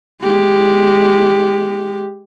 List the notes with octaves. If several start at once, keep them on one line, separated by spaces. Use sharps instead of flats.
G#3 G4